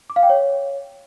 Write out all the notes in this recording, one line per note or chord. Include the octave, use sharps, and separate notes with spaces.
D6
F5
G5
C#5